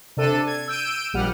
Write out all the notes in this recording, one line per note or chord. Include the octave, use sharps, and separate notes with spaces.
C3 D4 A4 D#7
G#6
E6 G6 D7 D#7
A#1 G3 F#5 F6